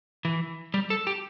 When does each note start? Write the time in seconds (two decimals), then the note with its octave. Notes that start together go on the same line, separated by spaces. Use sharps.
0.25 E3
0.74 G3
0.90 A4
1.07 G4